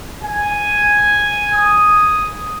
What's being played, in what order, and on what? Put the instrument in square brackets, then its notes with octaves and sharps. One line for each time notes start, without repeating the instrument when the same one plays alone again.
[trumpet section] G#5
D#6